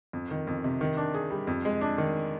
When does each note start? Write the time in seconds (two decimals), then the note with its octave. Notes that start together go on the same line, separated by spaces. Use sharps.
0.13 F2
0.31 D#3
0.47 F2
0.64 C3
0.81 D#3
0.97 D4
1.14 G#4
1.30 G3
1.47 F2
1.65 G#3
1.81 D4
1.98 D#3